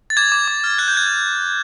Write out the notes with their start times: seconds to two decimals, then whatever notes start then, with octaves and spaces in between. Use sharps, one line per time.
0.10 A6
0.17 D6 G#6
0.32 D6
0.48 D6
0.64 F6
0.78 F#6 G#6
0.88 G6
0.94 F#6 G#6